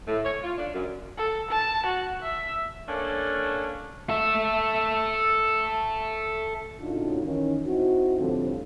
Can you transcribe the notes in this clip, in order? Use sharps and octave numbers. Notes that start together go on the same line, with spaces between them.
A2
C#5
F4
D4
F#2
A4
A5
F#4
E5
A3 A#3 C#4 D4
A4 E5
A2 C#3 D4 D#4 F4 F#4
D#3 E3 C#4
C4 D#4 E4 F#4
A2 D3 F3 G3 C4